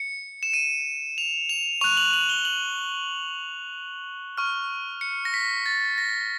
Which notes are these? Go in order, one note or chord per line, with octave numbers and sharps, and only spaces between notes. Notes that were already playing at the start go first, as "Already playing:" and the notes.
Already playing: C#7
E7
D#7
F7
F7
C#6 F#6 F7
F#7
F#7
G7
F#7
C#6 F6
C#7
A#6
B6
A6
A#6